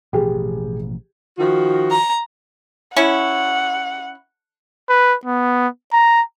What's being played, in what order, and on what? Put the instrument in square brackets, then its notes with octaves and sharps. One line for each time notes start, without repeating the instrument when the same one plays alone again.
[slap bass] A1 B2 F3 [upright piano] G4 G#4
[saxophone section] D#3 F3 F#4
[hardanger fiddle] A#5
[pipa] C#4 E4 [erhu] F#5
[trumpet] B4
B3
A#5